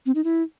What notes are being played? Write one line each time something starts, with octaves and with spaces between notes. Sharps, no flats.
C4
D#4
E4